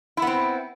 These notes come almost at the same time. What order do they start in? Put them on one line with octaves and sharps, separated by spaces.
E4 B3 C4